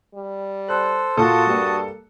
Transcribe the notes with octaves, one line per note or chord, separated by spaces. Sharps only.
G3
A4 C5 F#6
A#2 F4 F#4 A4 A5 D#6
G2 G3 A#3